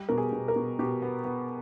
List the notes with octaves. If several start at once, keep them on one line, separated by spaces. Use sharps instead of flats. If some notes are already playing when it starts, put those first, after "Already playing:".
Already playing: G3 G4
B2 A#4
G#4
B2
A#4
B2
B2 G4
B3
B3